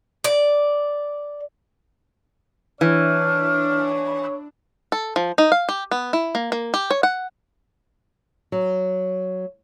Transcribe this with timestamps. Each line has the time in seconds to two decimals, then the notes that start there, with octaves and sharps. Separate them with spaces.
0.24 D5
2.81 E3 D4 C#5 F6
4.92 A4
5.16 F3
5.38 D#4
5.52 F5
5.69 G4
5.91 B3
6.13 E4
6.35 A#3
6.52 A#3
6.74 G4
6.91 C#5
7.03 F#5
8.52 F#3